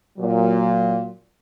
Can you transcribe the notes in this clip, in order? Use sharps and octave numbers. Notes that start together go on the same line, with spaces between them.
A#2 F#3